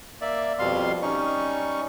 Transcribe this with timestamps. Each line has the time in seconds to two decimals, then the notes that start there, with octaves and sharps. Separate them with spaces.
0.21 A#3 D5 E5
0.59 F2 B2 G3 F5 C6
1.02 G3 C#4 D#4 C#6